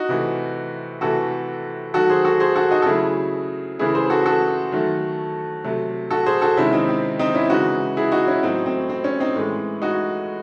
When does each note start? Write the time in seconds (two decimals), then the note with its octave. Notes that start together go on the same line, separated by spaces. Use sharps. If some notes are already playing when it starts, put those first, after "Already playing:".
Already playing: D#4 F#4
0.09 C3 E3 A3
1.01 C3 E3 A3 F#4 A4
1.94 D#3 F#3 A3 F#4 A4
2.10 G#4 C5
2.25 F#4 A4
2.40 G#4 C5
2.56 F#4 A4
2.71 D#4 F#4
2.82 A4
2.86 C#3 F#3 A3 E4 G#4
3.79 C#3 E3 A3 E4 G#4
3.95 G#4 C5
4.10 F#4 A4
4.26 F#4 A4
4.72 D#3 F#3 A3
5.64 C3 F#3 A3
6.11 F#4 A4
6.26 G#4 C5
6.42 F#4 A4
6.57 C3 D#3 G#3 C#4 E4
6.72 C4 D#4
6.88 C4
7.19 C4 D#4
7.34 C#4 E4
7.50 C#3 E3 G#3 D#4 F#4
7.97 E4 G#4
8.12 D#4 F#4
8.27 C#4 E4
8.43 A2 F#3 A3 C4 D#4
8.66 C4
8.89 C4
9.04 C#4
9.20 C4 D#4
9.36 A2 E3 G#3
9.82 D#4 F#4